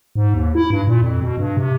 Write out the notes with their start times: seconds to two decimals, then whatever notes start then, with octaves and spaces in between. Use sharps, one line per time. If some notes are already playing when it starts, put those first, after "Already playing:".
0.16 G#2
0.34 D#2
0.55 E4
0.70 G2
0.87 A#2
1.02 F2
1.22 B2
1.38 G2
1.57 C3